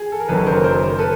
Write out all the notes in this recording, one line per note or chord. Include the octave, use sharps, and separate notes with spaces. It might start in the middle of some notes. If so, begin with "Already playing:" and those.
Already playing: G#4
A4
A#4
F#1 F#2 D#3 F#3 A4 B4
A#4 C5
A#4 C5
A4 B4